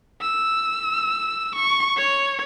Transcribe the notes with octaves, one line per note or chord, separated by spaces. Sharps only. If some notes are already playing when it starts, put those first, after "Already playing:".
E6
C#6
C#5